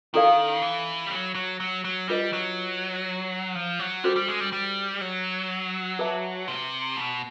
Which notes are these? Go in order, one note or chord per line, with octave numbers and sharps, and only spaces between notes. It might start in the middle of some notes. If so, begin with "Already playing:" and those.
D#3 C#4 E4 A4 D5 F5
E3
G3
F#3
F#3
F#3
F#3
G3 D4 F4 G#4 B4 D#5
F#3
F3
F#3
G3 C#4 F#4 A4 C5
G3
G#3
G3
G3
F#3
G#4 B4 E5 A5
C3
B2